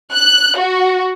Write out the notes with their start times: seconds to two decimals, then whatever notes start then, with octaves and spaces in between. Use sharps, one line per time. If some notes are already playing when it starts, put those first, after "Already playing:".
0.14 F#6
0.59 F#4